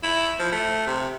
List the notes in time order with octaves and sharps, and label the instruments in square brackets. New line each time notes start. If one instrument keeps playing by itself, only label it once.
[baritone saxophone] E4
F3
A3
C3